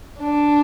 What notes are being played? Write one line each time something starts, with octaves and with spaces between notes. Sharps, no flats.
D4